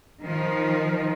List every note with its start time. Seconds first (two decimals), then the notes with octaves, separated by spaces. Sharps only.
0.22 D#3 F3